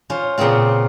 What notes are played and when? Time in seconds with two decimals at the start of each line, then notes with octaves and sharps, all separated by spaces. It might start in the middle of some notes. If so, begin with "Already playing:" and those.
0.10 C#4 F4 C5
0.38 A#2 C#3 B3 C4 F4